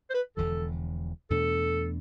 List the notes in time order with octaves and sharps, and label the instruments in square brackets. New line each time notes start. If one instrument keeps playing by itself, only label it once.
[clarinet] C5
B4
[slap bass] E1 E2 D3 F3 [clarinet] A4
[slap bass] E2 B2 A3 D4 [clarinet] A4